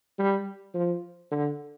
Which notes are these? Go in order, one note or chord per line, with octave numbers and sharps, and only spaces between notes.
G3
F3
D3